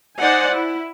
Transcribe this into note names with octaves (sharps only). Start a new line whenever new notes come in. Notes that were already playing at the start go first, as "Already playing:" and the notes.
D#4 C5 D5 F#5 G#5
E4